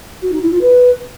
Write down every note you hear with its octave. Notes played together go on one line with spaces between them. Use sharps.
F#4
D#4
E4
F4
B4